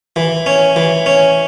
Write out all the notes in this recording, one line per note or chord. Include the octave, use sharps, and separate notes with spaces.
E3
C#4
E3
C#4